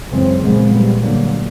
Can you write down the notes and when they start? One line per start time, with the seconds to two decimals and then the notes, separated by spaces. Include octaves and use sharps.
0.11 F#2 C#3 E3 G#3 C4
0.41 A#2 F3 G#3 B3
0.71 A#2 G3 B3
1.01 D3 F#3 A#3